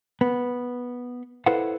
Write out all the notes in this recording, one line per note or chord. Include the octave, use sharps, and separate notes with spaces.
B3
E4 A4 B4 C5 F5 F#5